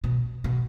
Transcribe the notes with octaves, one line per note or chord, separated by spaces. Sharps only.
B2
B2